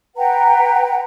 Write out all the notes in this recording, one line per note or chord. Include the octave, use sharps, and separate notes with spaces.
B4 F#5 G5 A#5